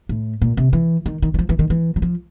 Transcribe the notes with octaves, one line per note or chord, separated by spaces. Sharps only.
A2
A#2
C3
E3
D#3
D#3
E3
F3
E3
D#3
E3
F#3
F3